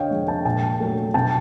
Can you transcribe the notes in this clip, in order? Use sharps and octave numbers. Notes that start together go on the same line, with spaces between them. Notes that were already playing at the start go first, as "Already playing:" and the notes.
Already playing: D3 C#5 D#5 F5 G5
F3 G#3
G5 A5
A#2 G5 A5
F#3 A3
B2 G5 A5